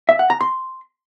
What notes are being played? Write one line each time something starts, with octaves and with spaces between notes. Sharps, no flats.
E5
F#5
A#5
C6